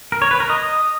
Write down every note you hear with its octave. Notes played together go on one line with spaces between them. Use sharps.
A#4
C#5
B4
A#4
D#5